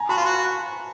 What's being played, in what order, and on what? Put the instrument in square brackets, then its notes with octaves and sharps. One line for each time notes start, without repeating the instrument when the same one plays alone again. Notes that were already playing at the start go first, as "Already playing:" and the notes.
Already playing: [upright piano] G#5 A#5
[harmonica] F#4 [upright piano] A5 B5
[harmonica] F4
F#4